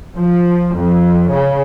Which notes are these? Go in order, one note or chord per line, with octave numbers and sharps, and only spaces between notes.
F3
F2
C#3